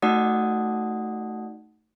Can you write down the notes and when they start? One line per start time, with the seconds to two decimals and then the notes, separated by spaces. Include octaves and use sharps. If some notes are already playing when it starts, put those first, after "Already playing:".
0.02 A3 D#4 F#4 D5 F#5 D#6